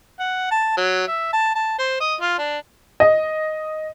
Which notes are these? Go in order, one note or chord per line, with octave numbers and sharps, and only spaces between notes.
F#5
A5
F#3
E5
A5
A5
C5
D#5
F4
D4
D#5